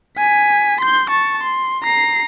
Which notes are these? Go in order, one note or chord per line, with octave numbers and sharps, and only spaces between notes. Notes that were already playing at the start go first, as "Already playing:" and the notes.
G#5 B6
C6 G6
A5 C#6
C6
A#5 C7